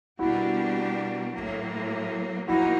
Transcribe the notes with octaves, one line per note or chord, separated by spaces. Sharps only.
B2 G3 A#3 D4 E4 F#4 G4
A2 F#3 A#3
F3 A#3 D#4 E4 F#4